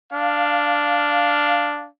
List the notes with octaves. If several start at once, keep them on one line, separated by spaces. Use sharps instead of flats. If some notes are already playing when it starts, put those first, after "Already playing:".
D4 F5